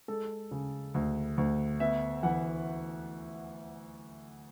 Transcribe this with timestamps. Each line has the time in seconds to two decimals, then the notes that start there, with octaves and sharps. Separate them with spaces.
0.08 G#3 A4
0.51 C#3
0.94 D2
1.38 D2
1.80 B3 E5
2.23 E3 F#5